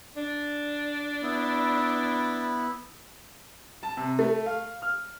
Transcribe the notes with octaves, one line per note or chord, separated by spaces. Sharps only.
D4
B3 E4
A5
C3
A3
F5
F6